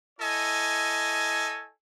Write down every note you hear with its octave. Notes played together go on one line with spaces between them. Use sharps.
E4 A4 C#5 D#5 G#5